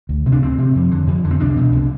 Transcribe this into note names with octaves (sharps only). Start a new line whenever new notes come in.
D2
C3
D4
D2 C4
C3
F2
D3
F2
D3
C4
C2 D4
B2
C2